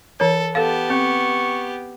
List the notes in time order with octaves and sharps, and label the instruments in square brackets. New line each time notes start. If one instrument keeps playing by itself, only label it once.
[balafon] E3 C#5 [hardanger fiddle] A4
[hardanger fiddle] B3 G4 [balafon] A4 F5 [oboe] A5
[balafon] C4 [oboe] C#6